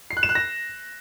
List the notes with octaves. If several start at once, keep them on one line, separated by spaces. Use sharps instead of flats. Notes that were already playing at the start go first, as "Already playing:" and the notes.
C7
F#6
E7
F#6
A#6